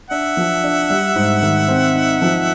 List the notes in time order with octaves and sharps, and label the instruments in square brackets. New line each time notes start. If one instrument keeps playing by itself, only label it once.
[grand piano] D4 [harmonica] E5 F#5
[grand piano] F3
D4
G3
G#2
D#3
C4
D#4
F3